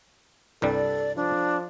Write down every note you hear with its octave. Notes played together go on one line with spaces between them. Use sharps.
C2 G2 G3 A4 D5
F3 D4